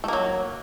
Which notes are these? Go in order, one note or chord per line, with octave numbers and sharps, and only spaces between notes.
F#3 A3 A#3